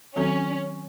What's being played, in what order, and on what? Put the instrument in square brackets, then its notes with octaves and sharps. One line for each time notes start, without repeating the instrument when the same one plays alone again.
[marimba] D#3 F#3 C4 F#4 A4 [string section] C#4